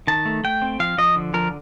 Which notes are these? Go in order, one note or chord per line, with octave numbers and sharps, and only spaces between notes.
D#3 A5
A3
A3 G5
C4
F3 F5
F3 D#5
D3
F3 A#4